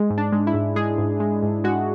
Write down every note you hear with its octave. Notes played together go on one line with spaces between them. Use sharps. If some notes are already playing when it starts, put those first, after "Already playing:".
Already playing: G#3
G#2
D4
G#3
E4
G#2
G#3 G#4
G#2
G#3
G#2
G#3 F#4